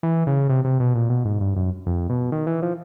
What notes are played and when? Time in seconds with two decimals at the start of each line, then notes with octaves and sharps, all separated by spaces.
0.03 E3
0.27 C#3
0.49 C3
0.65 C3
0.80 B2
0.95 A#2
1.09 B2
1.25 G#2
1.40 G2
1.56 F#2
1.87 F2
2.10 B2
2.32 D#3
2.47 E3
2.62 F3